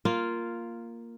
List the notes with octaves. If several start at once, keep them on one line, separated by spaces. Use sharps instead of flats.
A#3 F4